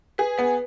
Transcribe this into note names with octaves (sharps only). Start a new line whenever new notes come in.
G#4 B4
B3 B4